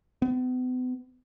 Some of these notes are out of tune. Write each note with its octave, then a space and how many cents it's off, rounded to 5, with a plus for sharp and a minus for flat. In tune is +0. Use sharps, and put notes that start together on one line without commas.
B3 +40